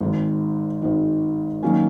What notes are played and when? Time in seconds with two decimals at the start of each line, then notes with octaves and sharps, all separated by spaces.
0.01 G#1 G#2 D#3
0.82 G#1 G#2 D#3
1.63 D#3 F#3 A#3 C#4